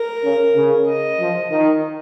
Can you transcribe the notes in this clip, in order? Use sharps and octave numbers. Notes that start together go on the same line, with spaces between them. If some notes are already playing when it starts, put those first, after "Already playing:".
Already playing: A#4
C#3
C#3
D#5
F3
D#3